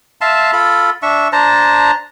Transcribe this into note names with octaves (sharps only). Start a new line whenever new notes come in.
E5 F5 A5 C6
F4 A4 B5
D4 E5 C#6
D4 C5 A5 A#5